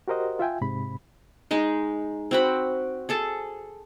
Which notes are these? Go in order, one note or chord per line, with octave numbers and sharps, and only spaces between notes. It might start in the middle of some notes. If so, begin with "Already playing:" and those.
F#4 G4 A#4 C5 D#5 F#5
F4 E5 G5 G#5
G#2 C3 B5
G#3 D#4 G#4
C4 F#4 B5
G#4 A4 A5